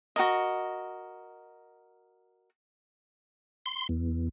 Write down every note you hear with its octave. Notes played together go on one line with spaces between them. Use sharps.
F#4 A4 A#4 D#5
C6
E2